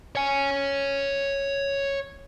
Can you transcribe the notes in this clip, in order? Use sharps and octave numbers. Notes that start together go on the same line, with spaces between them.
C#5 G#5